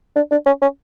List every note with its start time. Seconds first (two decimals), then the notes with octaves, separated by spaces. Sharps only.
0.16 D4
0.31 D4
0.46 C#4
0.62 C#4